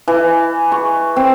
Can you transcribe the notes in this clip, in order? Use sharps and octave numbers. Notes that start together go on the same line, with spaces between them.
E3
C#6
C4